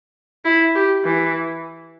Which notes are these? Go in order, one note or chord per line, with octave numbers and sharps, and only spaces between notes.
E4
G4
E3